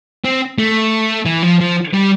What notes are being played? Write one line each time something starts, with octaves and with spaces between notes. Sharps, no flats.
C4
A3
E3
F3
F3
G3